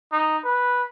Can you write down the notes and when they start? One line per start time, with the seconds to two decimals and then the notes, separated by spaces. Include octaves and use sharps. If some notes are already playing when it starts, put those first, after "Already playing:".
0.12 D#4
0.45 B4